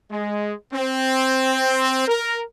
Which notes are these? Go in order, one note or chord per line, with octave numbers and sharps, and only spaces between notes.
G#3
C4
A#4